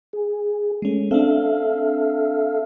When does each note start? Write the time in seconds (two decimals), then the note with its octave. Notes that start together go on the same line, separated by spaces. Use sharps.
0.13 G#4
0.82 G#3 A3 C#4
1.11 C4 D4 A4 E5 F5